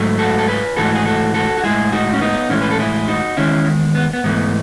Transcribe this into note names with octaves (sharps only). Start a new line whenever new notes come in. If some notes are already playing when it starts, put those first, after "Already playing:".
Already playing: G#2 F#3 A3
F#4 A4
A4
G#4 B4
G#2 E3 A3 F#4 A4
G#4
F#4 A4
F#4 A4
F#4
A2 G#3 E4 G#4
D#4 F#4
C#4
B3 D#4
A2 E3 G#3 C#4 E4
B4
A4
E4 G#4
D#4 F#4
E2 D#3 G#3 C#4 E4
B3
B3
G#2 E3 A3 B3